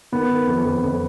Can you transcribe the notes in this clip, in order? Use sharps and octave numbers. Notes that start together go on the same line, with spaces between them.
D#3 B3
D#3
F2
F2
F2